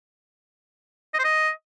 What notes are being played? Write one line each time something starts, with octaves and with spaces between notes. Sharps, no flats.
D#5
C5
D#5